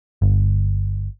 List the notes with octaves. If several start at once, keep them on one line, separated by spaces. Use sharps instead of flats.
G1